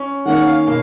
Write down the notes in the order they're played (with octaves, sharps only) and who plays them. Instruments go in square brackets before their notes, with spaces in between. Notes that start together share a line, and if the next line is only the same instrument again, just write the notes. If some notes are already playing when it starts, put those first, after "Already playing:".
Already playing: [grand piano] C#4
[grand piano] D#3 A#3 C#4 [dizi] F#5
[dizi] F5
[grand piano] B2 A#3